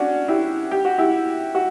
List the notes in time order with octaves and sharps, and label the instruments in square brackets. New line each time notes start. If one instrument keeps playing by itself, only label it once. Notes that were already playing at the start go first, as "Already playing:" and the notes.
Already playing: [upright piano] C#4 D4 F#4
E4 G4
G4
F#4
E4 G4
F#4